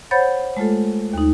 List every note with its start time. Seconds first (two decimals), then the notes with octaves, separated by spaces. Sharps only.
0.11 C5 C#5 F#5 B5 G6 A6
0.57 G#3 A3 F4 A4
1.13 D#2 D#4